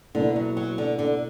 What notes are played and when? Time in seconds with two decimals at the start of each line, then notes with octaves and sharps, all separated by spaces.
0.15 B2 D3 A#3 E4
0.36 F#3
0.57 F#3
0.78 D3
0.99 D3